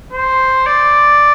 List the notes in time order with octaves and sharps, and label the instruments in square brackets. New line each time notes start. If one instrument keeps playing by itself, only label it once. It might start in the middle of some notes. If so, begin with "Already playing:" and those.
[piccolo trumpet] C5
D5